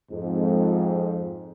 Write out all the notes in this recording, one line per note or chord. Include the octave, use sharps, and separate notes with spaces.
F2 G#2